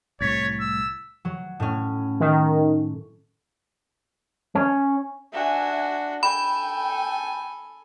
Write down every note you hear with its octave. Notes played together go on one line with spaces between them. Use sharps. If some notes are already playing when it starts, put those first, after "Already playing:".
C2 A2 C3 C#5 G#6 A6 B6
E6
F#3
A2 C#4
D#3
C#4
D4 F#4 E5 G#5
A4 G5 G#5 B5